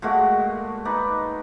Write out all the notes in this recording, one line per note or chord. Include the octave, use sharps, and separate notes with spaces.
A#2 G#3 A3 F#4
D#4 B4 D5